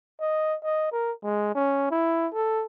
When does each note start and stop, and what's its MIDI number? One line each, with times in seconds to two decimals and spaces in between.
0.20 0.56 75
0.64 0.92 75
0.92 1.12 70
1.23 1.54 56
1.55 1.90 61
1.91 2.28 64
2.33 2.65 69